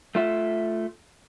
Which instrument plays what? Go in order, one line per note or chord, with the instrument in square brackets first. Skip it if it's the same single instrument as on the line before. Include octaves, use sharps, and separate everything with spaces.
[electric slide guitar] A3 F4 E5